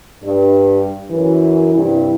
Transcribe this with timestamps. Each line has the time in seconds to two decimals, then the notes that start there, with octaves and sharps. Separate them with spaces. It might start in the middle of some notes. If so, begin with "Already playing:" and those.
0.24 G2 G3
1.10 F#2 E3
1.74 G2 C3 E4